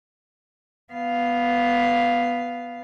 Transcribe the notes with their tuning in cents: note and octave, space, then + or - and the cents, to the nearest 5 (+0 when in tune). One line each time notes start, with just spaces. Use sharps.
B3 +0 F5 -5